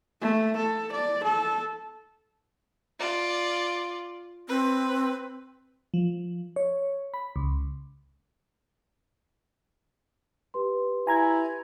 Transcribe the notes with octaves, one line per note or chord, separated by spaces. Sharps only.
A3
A4
D5
A4
F4 D5
C4 B4
F3
C#5
B5
C#2
G4 B4 C6
E4 G#5 A#5 G#6